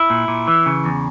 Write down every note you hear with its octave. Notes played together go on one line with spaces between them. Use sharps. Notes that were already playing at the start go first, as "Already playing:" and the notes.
Already playing: E4
A#2
A#2
E3
C#3
E2